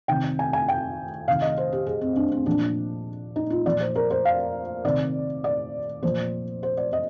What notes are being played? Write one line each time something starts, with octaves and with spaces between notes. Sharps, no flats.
C3 D#3 G5
G#5
G#5
G5
C3 D#3 F5
D#5
C5
G4
G#4
C4
D4
C4
A#2 F3 D4
D#4
F4
A#2 F3 D5
C5
A#4
C5
F5
C3 D#3 D5
D5
A#2 F3 C5
C5
D5
D#5